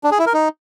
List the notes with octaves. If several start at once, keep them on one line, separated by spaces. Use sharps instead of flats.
D4
G#4
E4
A#4
D#4